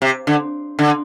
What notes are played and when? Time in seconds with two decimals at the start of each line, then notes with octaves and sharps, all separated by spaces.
0.02 C3
0.27 D3
0.79 D3